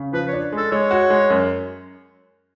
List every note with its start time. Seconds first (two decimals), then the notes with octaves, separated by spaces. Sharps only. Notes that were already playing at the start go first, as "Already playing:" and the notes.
Already playing: C#3
0.13 F3 B4
0.28 C#5
0.33 D4
0.52 G#3 A4
0.72 G#3 C#5
0.91 F#4
1.10 G#3
1.30 F#2